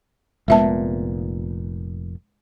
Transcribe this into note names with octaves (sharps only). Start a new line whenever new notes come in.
F1 A#2 G#3 B3 E5 A5